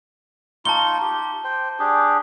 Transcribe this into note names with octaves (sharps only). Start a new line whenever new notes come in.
D#4 F4 A5 C#6 G7
G4
C5 G5
D4 G4 G#4